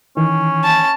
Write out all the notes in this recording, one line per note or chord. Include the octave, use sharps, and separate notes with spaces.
D#3 E3 C#4
A5